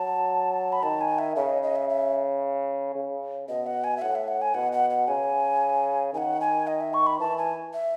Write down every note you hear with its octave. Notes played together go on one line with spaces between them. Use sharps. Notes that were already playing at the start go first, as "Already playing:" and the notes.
Already playing: F#3 A5
B5
D#3 A5
G#5
E5
C#3 E5
D#5
D#5
E5
E5
C#3
B2 D#5
F#5
G#5
E5
A2 F#5
E5
F#5
G#5
B2 F#5
F#5
F#5
C#3 G#5
D#3 F#5 G#5
G#5
D#5
E5
C#6
B5
E3 A5
G#5
E5